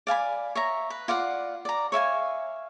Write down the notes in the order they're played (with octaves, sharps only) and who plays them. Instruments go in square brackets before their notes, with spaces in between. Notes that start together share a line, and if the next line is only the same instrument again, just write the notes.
[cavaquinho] D5 F5 G#5 B5
C#5 E5 A#5
B4
F4 D5 F5 F#5
D5 A#5
C#5 E5 F5 G#5